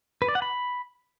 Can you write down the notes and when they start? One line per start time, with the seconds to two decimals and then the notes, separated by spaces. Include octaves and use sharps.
0.22 B4
0.28 D5
0.35 F#5
0.42 B5